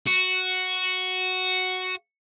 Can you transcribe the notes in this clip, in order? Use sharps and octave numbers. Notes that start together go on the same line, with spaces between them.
F#4